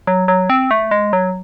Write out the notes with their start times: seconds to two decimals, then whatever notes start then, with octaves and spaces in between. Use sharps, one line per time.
0.07 F#3
0.28 F#3
0.50 C4
0.71 A3
0.91 G#3
1.13 F#3